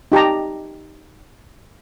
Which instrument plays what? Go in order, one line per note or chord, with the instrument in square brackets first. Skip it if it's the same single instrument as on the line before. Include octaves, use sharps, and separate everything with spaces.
[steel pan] D#4 G4 A5 A#5